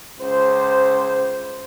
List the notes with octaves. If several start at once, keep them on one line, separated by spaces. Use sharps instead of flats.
C#2 C5